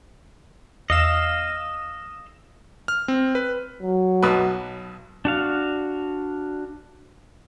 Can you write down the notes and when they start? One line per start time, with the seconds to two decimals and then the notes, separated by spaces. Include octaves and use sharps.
0.90 E2 D#5 F5 E6 E7
2.88 F6
3.08 C4
3.35 B4
3.83 F#3
4.23 B1 B2 B4
5.25 D4 F#4 F5